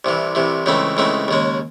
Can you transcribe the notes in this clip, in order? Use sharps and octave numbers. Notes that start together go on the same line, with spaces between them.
C2 C3 E3
C2 C3 E3
C#2 C#3 E3 A3 C4
C#2 C#3 E3 A3 C4
D#2 C#3 G#3